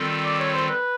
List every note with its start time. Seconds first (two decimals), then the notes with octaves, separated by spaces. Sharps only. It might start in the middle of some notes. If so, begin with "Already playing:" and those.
Already playing: D#3 G3 C4 F4 A4
0.25 D5
0.39 C#5
0.53 C5
0.69 B4